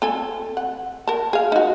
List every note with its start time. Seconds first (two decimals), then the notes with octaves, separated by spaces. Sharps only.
0.02 C4 A4 G#5
0.57 F#5
1.07 A#4 A5
1.33 G#4 F5
1.52 D#4 F#4